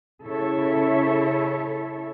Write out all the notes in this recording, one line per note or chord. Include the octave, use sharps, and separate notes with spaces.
C#3 E4 A4 C#5 E5